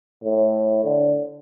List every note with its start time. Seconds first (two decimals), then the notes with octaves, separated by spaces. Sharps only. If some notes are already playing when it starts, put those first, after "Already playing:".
0.24 A2
0.84 D3